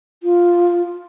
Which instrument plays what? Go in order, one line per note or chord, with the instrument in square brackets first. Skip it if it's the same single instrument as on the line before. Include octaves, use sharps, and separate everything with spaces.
[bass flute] F4